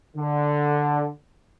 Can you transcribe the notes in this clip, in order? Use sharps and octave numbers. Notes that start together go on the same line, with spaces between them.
D3